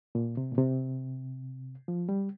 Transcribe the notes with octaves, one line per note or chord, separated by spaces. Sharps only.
A#2
C3
A#2
C3
F3
G3